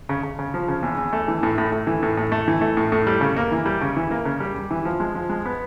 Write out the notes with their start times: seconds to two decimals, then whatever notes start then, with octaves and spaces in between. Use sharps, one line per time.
0.09 C#3
0.23 C#3
0.39 C#3
0.54 F3
0.68 C#3
0.83 E2
0.97 E2
1.13 A3
1.28 E3
1.43 A2
1.58 A2
1.72 A2
1.87 E3
2.03 A2
2.17 A2
2.32 A3
2.48 E3
2.61 A3
2.77 A2
2.92 A2
3.07 G3
3.21 C#3
3.36 A#3
3.52 E3
3.66 G3
3.81 C#3
3.96 E3
4.11 A#3
4.25 C#3
4.40 G3
4.55 G3
4.71 E3
4.85 F3
5.00 G#3
5.15 F3
5.29 G#3
5.45 B3